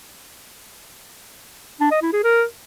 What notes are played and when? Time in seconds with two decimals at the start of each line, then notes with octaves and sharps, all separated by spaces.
1.80 D4
1.91 D#5
2.02 E4
2.13 G#4
2.24 A#4